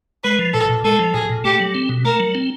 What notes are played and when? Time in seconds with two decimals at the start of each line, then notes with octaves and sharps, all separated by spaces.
0.24 G#3 B4
0.39 F3
0.53 A#2 A4
0.69 A#2
0.84 G#3 A4
0.99 F3
1.14 A#2 G#4
1.29 A#2
1.44 A3 G4
1.60 F#3
1.74 C4
1.89 B2
2.05 A3 A#4
2.20 F#3
2.35 C4